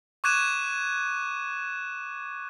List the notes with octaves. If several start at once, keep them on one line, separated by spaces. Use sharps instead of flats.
C#6 D6 F#6 G#6 D#7 E7